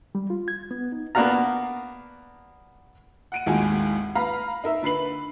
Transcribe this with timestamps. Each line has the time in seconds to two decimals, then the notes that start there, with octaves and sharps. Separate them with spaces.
0.15 G3
0.30 F4
0.48 G#6
0.71 B3
0.92 D#4
1.15 A#3 B3 D4 F#4 F5 A#5
3.32 F#5 D7 D#7
3.46 G#1 D#2 A2 G#3 F#4 G#5
4.15 B4 F5 A#5 B5
4.64 D#4 A#4 E5
4.83 D3 B4 C7 F#7